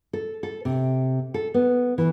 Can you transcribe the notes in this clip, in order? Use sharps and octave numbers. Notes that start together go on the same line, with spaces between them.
A4
A4
C3
A4
B3
E3